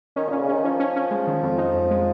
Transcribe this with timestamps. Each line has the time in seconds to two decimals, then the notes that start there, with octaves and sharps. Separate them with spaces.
0.16 D#3 C#4
0.29 A#2 C#4
0.40 C#3
0.49 D#3 C#4
0.63 F3 C#4
0.80 C#4
0.96 C#4
1.11 G#3
1.27 D#3
1.42 F2
1.58 D#4
1.74 F2
1.91 G#3